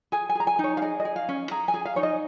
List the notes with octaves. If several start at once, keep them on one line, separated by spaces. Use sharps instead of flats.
G#4 G#5
G#5
G#4 A#5
G#5
D#4 C#5
F5
G#4 D#5
D#5
G#4
F5
C#4
G#4 A#5
G#5
G#4
F5
D#4 C#5
D#5